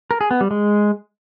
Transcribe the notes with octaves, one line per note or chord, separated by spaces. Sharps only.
A#4
G#4
B3
G3
G#3